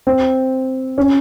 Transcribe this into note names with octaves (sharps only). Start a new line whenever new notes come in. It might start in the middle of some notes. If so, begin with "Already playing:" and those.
C4
C#4